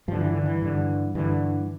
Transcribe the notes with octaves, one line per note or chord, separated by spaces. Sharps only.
G2 D3 F3
E3
D3
E3
G2 D3
G2 D3 E3